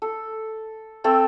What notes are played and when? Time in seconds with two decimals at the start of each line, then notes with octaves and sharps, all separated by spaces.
0.02 A4
1.04 A3 C4 A4